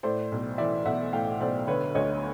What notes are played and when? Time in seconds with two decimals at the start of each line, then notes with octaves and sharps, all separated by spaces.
0.03 A2 C5 D5
0.32 B1
0.58 E3 D5 E5
0.85 B1 E5 F#5
1.13 A2 F5 G5
1.40 B1 C5 D5
1.67 D3 B4 C#5
1.95 D2 C#5 D#5